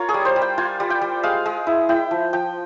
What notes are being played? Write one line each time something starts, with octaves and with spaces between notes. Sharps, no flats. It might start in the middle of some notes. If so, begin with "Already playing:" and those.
Already playing: F4 A#4 C#5
G#4
G3
C5
G3
G5
F4 G#5
G3
G5
G3
G#3 F5
G#3
E4
E4 G5
F3
F3 G5